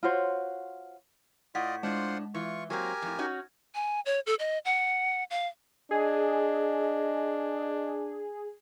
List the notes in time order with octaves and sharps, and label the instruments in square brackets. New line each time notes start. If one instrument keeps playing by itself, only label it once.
[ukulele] F4 F#4 C5 C#5
[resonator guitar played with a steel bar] A2 [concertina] F4 D5 D#5 [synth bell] F#5 B6
[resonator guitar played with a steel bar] A2 D4 [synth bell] G#3 [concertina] F4 C5 F#5
[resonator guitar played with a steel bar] E3 [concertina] F4 C#6
[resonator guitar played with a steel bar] F#3 A#3 C4 [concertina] G4 A#4 G#5 [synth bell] G#6
[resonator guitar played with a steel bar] F2 A2
C#4 D#4 F#4
[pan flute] G#5
C#5
A4
D#5
F#5
F5
[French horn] D4 [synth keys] G#4 [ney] D#5